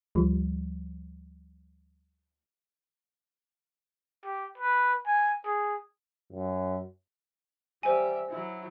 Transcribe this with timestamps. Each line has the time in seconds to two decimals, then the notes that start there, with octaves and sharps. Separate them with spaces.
0.15 D2 F3 G3
4.25 G4
4.58 B4
5.07 G#5
5.45 G#4
6.33 F#2
7.83 G3 C5 E5 G#5
8.29 F#3 E4